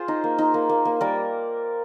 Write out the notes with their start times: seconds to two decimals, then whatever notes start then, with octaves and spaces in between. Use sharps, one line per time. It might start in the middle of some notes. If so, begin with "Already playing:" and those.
Already playing: F4 G#4 C5
0.08 D#4
0.24 A#3
0.38 D#4
0.54 A#3
0.69 A#3
0.85 A#3
1.01 G3 A#4 D5